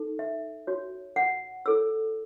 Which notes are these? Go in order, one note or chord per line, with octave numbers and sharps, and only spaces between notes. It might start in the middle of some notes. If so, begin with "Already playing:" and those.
Already playing: D#4 A4
E5
F#4 C#5
F#5
E4 A4 C#5 E6